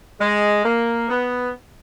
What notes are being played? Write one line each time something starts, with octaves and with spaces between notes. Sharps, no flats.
G#3
A#3
B3